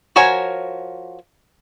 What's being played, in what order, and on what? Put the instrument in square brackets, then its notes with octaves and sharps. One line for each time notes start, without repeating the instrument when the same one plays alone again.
[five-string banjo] F3 F#4 A#4 C#5 G#5